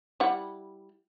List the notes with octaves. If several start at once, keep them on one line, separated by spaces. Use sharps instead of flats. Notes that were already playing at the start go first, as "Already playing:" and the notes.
G3 E4 F#5